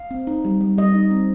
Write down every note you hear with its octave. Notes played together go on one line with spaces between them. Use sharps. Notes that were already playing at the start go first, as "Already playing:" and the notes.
Already playing: F5
C4
D#4
G3
G3
G3 D#5
D#4
C4